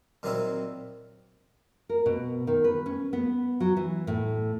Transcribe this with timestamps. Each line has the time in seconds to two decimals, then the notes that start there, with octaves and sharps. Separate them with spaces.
0.23 A#2 D#3 F#3 C4 D#4 E4
1.89 A#4
2.06 B2
2.47 D#3
2.64 B4
2.86 C#4
3.13 B3
3.60 F#3
3.77 E3
4.07 A2